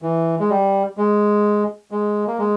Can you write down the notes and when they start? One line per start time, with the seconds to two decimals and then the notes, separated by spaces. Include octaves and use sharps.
0.02 E3
0.40 G#3
0.50 G3
0.97 G#3
1.91 G#3
2.27 A#3
2.39 G#3